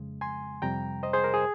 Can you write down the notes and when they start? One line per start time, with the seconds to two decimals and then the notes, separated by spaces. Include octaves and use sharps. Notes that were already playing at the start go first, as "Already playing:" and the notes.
Already playing: F2 C#3 G#3
0.21 G#5 C6
0.62 F2 C3 G3 G5 A#5
1.03 C5 D#5
1.13 G#4 C5
1.24 A#4
1.34 G#4